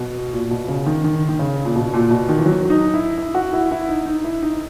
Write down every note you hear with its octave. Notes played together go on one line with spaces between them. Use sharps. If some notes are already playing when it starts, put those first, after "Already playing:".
Already playing: B2
A#2
B2
C#3
D#3
D#3
D#3
C#3
A#2
B2
A#2
B2
D#3
E3
F#3
D#4
E4
E4
F#4
E4
E4
D#4
D#4
E4
D#4